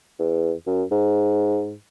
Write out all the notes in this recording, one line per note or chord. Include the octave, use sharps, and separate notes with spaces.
E2
F#2
G#2